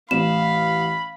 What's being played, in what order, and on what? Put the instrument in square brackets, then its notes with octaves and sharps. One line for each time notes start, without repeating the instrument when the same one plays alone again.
[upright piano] A1 [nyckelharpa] F5 [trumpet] B5 [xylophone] E7